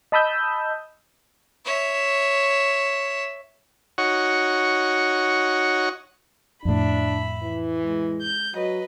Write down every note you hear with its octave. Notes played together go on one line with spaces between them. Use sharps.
D#5 A5 B5 D#6 E6 G6
C#5 E5
D#4 F#4 C#5 F#5 C#6
F2 A2 D4 E5 B5
E3
G#3
G6
F#3 B4 D#5